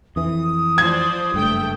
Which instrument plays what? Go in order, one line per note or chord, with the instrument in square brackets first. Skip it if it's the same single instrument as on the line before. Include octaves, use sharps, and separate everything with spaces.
[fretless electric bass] F2 E3 [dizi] D#6
[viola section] F3 C5 D5 [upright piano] G#6
[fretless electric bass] F#1 G2 [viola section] A3 G5